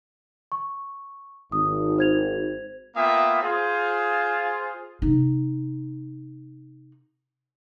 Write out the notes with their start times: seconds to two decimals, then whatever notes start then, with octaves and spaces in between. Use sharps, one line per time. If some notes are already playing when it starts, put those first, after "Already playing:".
0.52 C#6
1.52 G#1 D#6
1.98 C5 G#6 F7
2.96 A#3 B3 F4 E5 G5 D#6
3.42 F4 G#4 C5
5.02 C3 D#4